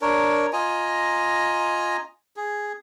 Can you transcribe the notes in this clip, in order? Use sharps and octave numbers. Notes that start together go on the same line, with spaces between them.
D4 A#4 C#5
F4 D#5 G#5 A#5
G#4